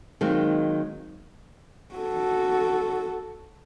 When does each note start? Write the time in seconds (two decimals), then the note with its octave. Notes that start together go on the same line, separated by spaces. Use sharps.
0.21 D#3 F#3 G#3 A#3 C4
1.95 F#4 A4